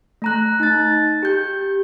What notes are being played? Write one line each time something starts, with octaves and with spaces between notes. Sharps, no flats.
A3 A#5 F#6
D#4 A6
G4 G6